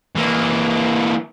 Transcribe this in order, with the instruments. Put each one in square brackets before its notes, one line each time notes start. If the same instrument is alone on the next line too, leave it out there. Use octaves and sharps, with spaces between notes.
[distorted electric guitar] E3 A#3